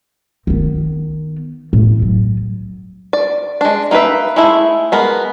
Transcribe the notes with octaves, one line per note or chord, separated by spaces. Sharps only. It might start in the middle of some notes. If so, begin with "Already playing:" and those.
D#3 B3
A2
F#3
D5
G#3 D4
A#3 D#4 G#4 B4 E5
G#3 A3 E4
G#3 B3 A#4